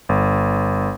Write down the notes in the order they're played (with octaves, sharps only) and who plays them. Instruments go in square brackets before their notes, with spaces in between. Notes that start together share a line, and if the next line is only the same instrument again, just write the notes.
[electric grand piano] G1